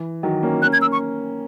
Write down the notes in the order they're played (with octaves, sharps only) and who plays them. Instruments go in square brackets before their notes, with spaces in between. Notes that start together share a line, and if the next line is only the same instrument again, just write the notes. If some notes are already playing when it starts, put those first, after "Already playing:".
Already playing: [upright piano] E3
D#3 F#3
A#3 C#4
[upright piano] A#3 C#4 [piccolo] F#6
[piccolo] G#6
E6
C#6